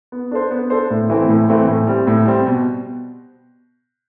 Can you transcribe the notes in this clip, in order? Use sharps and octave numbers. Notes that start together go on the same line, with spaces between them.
B3
D4 A4 C5
B3
D4 A4 C5
A2
E3 A3 C4 E4
A2
E3 A3 C4 E4
A2
G3 C4
A2
G3 C4
B2